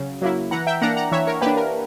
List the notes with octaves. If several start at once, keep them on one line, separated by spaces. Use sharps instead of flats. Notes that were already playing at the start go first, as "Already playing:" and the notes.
Already playing: C#3 F#3
F#3 A#3 E4
E3 F#5 A#5
E5 G5
A#3 D4 F#5 A#5
F#5 A#5
E3 C#5 E5
A#4 C#5
A#3 D4 G4 B4
A#4